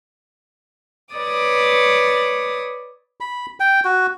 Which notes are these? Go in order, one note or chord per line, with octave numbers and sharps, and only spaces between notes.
B4 C#5 D5 D6 D#6
B5
G5
F#4